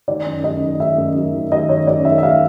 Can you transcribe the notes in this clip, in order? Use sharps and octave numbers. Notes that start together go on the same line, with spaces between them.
D#3 D5
F#2
F#2 D#5
D#3
D#3 E5
F#2
F#2
D#3
D#3 D#5
F#2 C#5
F#2 D5
D#3 E5
E5
D#3 F5